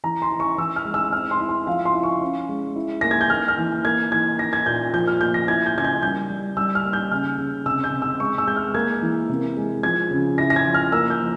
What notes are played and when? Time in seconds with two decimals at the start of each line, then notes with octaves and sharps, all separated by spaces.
0.04 E3 A#5
0.22 C6
0.31 E4
0.40 C#6
0.58 E3 E6
0.76 F6
0.85 G#3
0.94 E6
1.12 C4 F6
1.31 C6
1.40 E4
1.49 C6
1.67 F3 F5
1.85 C6
1.94 E4
2.03 C#6
2.21 C#4
2.49 G#3
2.76 E4
3.01 A#3 A#6
3.11 G#6
3.21 G6
3.30 A#3 F6
3.48 F6
3.58 E3
3.85 A#3 G#6
4.12 E3 G#6
4.39 E4 A#6
4.53 G#6
4.66 A#2 G6
4.94 F3 G6
5.07 F6
5.21 A#3 G6
5.34 A#6
5.48 E4 G#6
5.66 G6
5.75 C#3 G#6
5.84 G6
6.03 G3 G6
6.30 G3
6.57 G3 E6
6.75 F6
6.84 A#3
6.93 G6
7.11 C#3 F6
7.38 C#3
7.66 C3 E6
7.84 G6
7.93 C3
8.02 E6
8.20 G#3 C#6
8.38 E6
8.47 G#3 G6
8.56 F6
8.75 A#3 G#6
9.02 E3
9.29 C3
9.57 G#3
9.83 F3 G#6
10.11 C#3
10.38 E4 A#6
10.50 A#6
10.56 G#6
10.66 F3
10.74 F6
10.92 A#3 E6
11.10 G6
11.20 F3